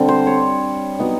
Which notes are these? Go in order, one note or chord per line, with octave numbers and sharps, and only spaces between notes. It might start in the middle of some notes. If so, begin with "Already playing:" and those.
Already playing: D3 G3 C4
C5
C#5
F#3 B3 D#4